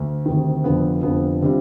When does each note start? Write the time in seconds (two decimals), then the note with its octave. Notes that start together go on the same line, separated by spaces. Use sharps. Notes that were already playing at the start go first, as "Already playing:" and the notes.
Already playing: D2
0.26 D2 C3 D#3
0.64 F1 F2 D3 F3 B3
1.02 F1 F2 D3 F3 B3
1.42 C3 G3 D4 F4